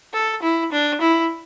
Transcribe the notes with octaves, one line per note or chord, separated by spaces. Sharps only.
A4
E4
D4
E4